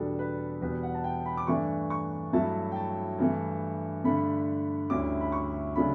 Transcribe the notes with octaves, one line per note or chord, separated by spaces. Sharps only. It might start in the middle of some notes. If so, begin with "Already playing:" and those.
Already playing: E2 B2 G3 D4 A4
B4
E2 B2 G3 B4
F#5
A5
G5
B5
D6
G2 E3 A3 D4 C#6
C#6
G2 F#3 A3 E4 A5
G5
A5
G2 E3 A3
G2 D3 A3 B5
D2 D3 G3 C#4 E4 D6
B5
C#6
C#3 F#3 A3 D4 B5